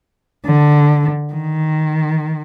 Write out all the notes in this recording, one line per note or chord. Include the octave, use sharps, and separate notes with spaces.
D3
D#3